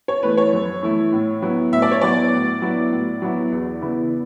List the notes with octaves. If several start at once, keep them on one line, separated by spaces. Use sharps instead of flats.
C#5
E3 A3 E4 B4
C#5
F#2
E3 A3 E4
A2
F#3 B3 E4
A2 E5
D5
C#5
F#3 B3 E4 D5
A2
F#3 B3 E4
A2
F#3 B3 E4
E2
C#3 E3 B3 E4